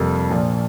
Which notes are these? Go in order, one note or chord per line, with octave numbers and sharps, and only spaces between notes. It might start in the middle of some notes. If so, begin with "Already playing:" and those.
Already playing: F2 C3 G3 A#3
A#1 A#2 F3